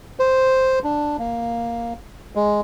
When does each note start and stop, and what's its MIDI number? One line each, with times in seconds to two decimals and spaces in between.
0.19 0.79 72
0.84 1.17 62
1.19 1.94 58
2.35 2.61 56